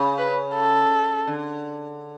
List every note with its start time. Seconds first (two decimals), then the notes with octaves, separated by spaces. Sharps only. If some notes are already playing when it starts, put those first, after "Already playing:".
Already playing: C#3
0.18 B4
0.55 A4
1.27 D3